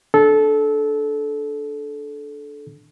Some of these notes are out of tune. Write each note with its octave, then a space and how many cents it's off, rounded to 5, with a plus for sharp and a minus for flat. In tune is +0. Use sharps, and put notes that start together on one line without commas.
D4 +0 A4 -20